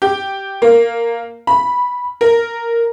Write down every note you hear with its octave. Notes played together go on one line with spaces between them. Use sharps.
G4
A#3
B5
A#4